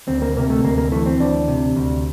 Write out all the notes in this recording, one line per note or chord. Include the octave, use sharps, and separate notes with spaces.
D2 C4
A#3
C3 A#3
A3
D2 A#3
A#3
E3 A3
C4
D2 D4
C3
D2